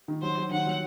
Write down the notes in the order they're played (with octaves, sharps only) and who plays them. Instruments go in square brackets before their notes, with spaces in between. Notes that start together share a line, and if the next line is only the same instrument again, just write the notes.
[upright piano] D#3
[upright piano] F#3 [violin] C5
[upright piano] F#3
[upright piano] D#3 [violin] F#5
[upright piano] F#3